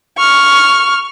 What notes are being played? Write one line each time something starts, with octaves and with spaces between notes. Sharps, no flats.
C#6 F6